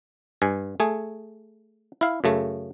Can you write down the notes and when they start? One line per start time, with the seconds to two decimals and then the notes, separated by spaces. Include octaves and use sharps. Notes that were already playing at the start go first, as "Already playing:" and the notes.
0.42 G2 G#5
0.80 A3 G#4
2.01 E4 F5
2.24 F#2 C#3 A3